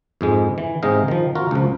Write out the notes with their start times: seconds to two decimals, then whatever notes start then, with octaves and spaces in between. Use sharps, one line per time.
0.21 F2 G#2 G#3
0.58 E3
0.83 G#2 C3 G#3 D#4 D#5 F5
1.08 D#3 F3
1.35 F4 F#4 A#4
1.51 C#2 F3